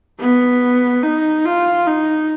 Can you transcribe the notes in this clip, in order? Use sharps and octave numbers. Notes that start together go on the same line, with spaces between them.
B3
D#4
F4
D#4